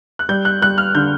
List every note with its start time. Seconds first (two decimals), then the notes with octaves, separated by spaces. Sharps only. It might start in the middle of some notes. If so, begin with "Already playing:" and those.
0.19 F#6
0.29 G3 G6
0.45 F#6
0.62 G3 F#6
0.78 F6
0.95 D3 G6